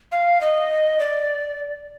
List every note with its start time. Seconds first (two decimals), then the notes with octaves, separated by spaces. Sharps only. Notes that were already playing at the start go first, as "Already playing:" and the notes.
0.12 F5
0.41 D#5
0.99 D5